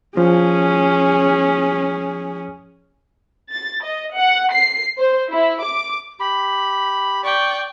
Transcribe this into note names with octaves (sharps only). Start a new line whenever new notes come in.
F3 C#4 G#4
A6
D#5
F#5
C7
C5
E4
D6
G4 B5
D5 G5 C#6